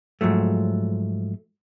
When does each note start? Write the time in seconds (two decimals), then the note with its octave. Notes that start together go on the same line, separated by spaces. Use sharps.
0.21 G#2 F3 F#3 A3